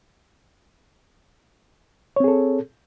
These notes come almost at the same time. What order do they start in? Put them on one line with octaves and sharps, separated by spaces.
C#5 C4 G#4 A4